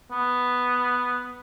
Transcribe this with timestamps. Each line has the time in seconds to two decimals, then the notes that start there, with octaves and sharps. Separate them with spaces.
0.11 B3